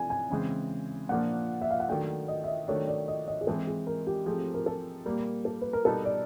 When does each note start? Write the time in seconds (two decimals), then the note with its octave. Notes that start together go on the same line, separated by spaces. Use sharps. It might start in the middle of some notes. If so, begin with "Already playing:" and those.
Already playing: C3 F3 A3 D4 G#5
0.10 G#5
0.30 C#3 E3 G#3 C4
1.09 A#2 F3 A#3 D4 F4 F#5
1.62 E5
1.71 F5
1.80 F#5
1.88 D#3 F#3 A3 D4 G5
2.28 D#5
2.44 E5
2.48 D#5
2.68 D#3 F#3 A3 D4 C#5
2.88 D5
3.08 D#5
3.28 D#5
3.41 G#4
3.47 E3 G#3 C4 A4
3.67 G#4
3.87 A#4
4.07 G4
4.26 F3 A3 C4 G#4
4.54 A#4
4.66 A4
5.06 A#2 G3 A#3 A#4
5.45 A4
5.62 B4
5.73 A#4
5.85 B2 G3 B3 D#4 A4
6.05 D5